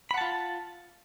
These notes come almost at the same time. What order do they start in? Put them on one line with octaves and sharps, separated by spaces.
B5 F#5 A5 F4